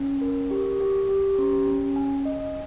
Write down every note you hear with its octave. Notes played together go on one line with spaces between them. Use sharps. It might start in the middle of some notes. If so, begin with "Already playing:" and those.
Already playing: C#4
A#4
G4
G4
G4
C#4
C#4
G#5
D#5